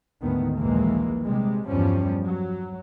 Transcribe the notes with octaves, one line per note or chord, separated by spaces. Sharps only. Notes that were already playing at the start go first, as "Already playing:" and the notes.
D2 G#2 D#3 B3
A#1 D#2 A#2 E3 G#3 A#3
C3 G3 G#3
E2 G2 F3 G3 C#4
F#3